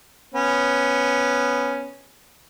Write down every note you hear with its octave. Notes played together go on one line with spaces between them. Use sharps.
B3 C#4